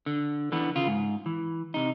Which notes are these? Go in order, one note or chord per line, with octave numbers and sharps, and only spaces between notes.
D3
D3 E3 B3
C#3 F4
G#2
E3
C3 D#4